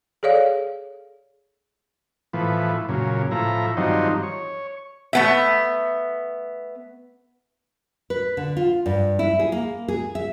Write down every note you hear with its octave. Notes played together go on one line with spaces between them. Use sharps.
G#4 A4 C#5 D5 F5
A2 E3 F3 B3
F#2 A#2 C#3
A2 F3 E4 A#5
G2 D#3 F3 F#3 C4 D#4
C#5
A3 B3 E5
B4
D3
F4
G2
E4
G#4
A#3
G#4
E5